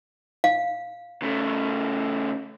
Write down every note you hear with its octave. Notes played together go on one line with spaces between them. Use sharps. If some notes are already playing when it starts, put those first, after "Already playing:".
F5
C#3 A3